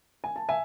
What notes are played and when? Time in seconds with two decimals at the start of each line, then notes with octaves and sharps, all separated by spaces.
0.24 G#5
0.36 A5
0.49 E5 G#5